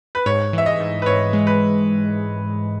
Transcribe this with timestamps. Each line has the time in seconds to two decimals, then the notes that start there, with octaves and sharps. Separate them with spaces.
0.15 B4
0.26 G#2 C#5
0.53 E3 E5
0.66 D#5
0.80 G#2
1.02 B4
1.06 G#2 C#5
1.33 G#3
1.47 B4